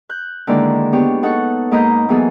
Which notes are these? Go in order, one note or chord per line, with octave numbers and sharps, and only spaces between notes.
F#6 G6
D3 D#3 G#3 A#3 E4 D5
B3 D4 G4 C#5
D#4 A4 F#5 C#6
G#2 A#3 D#5 A#5 B5 G6
E3 F#3 A#3 B3 G#4 A4